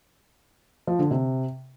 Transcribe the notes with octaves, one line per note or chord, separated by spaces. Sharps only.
F3
D3
C3